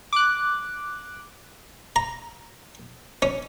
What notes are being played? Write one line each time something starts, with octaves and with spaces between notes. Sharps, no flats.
D6 F#6
A#5
C#4